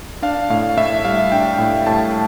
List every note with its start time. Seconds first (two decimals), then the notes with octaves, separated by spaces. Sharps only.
0.22 D4 F5
0.50 A2 F5
0.77 A2 E5
1.05 G3 F5
1.32 D4 G5
1.59 A2
1.86 A2 A5